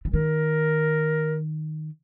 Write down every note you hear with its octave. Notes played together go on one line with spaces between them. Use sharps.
E3
D#3 A#4